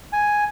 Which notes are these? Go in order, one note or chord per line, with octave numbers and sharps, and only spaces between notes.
G#5